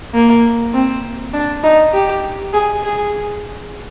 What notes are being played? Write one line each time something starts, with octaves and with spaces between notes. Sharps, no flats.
A#3
C4
D4
D#4
G4
G#4
G#4